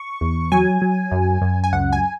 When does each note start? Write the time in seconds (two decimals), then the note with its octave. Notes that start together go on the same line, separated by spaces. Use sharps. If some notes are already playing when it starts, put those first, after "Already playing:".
Already playing: C#6
0.21 E2
0.52 F#3 G#5
0.82 F#3
1.12 F#2
1.42 F#2
1.64 G#5
1.73 C#2 F#5
1.93 G#5